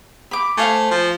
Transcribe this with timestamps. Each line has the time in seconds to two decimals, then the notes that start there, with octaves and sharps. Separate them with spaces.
0.31 B5 D6
0.57 A3 C5 F5 G#5
0.91 F3